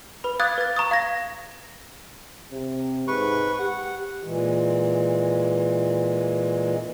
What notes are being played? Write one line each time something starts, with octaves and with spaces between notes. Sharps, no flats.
B4 B5
F5 D6 D#6 F#6 G#6 A6
B4 A6
A#5 C#6 D#6
F5 G#6 A#6
C3
G#2 B4 C#6
G4 F#5
A#2 E3 G#3